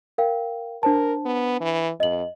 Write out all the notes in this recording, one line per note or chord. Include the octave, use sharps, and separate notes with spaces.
A#4 F5 G5
D4 A#4 C5 A5
B3
E3
F2 D#5 F#7